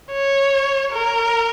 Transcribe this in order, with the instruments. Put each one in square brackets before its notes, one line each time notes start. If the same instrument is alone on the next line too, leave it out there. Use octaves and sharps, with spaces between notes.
[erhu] C#5
A#4